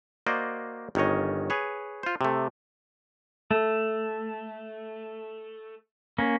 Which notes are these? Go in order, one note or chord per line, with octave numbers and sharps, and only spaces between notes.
A#3 F#4 C5 D5 D#5
G1 D#3 C#4 C#5 D#5
G#4 B4 C#5
F4 C5
C3 A3
A3
A#3 C#4